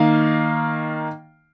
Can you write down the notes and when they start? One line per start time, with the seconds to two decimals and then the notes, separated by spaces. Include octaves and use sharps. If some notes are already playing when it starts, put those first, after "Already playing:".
Already playing: D#3 A#3 D#4 F5